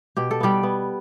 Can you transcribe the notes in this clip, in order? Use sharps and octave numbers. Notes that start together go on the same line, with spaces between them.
B2 G4
A4
G3 B3 G4
B3